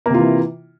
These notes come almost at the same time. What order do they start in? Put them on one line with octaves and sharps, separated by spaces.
A#3 C3 F4 E3